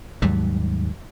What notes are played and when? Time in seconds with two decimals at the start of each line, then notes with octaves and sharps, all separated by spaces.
0.22 D#2 G#2 F#3 G3